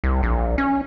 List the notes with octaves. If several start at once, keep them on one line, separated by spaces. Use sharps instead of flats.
C2
A#1
C#4